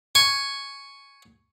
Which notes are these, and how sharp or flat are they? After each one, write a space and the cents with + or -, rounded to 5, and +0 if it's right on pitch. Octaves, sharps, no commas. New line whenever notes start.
G#5 +0 C#6 +0